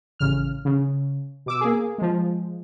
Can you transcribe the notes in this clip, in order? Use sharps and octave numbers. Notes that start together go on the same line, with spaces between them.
A1 C#3 F6
C#3
B2 D6 E6
A#3 G#4
F3 G#3